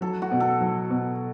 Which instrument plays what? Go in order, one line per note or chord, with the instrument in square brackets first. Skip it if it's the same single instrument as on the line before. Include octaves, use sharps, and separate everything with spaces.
[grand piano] F#3 [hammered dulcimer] A4
[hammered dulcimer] F#4
[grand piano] B2
[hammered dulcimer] A4
[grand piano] F#3
B2